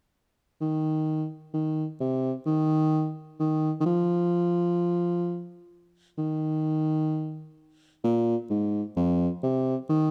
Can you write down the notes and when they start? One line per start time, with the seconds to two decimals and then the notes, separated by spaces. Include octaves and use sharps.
0.61 D#3
1.54 D#3
2.00 C3
2.46 D#3
3.40 D#3
3.80 D#3
3.86 F3
6.18 D#3
8.04 A#2
8.50 G#2
8.97 F2
9.43 C3
9.89 D#3